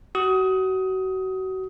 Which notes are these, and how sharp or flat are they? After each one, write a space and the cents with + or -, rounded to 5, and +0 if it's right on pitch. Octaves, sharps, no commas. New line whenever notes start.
F#4 +30 D#6 +20